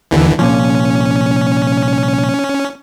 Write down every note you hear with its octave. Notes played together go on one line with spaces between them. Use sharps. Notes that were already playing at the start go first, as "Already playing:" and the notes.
D#2 D3 E3
C2 A#2 F3 C#4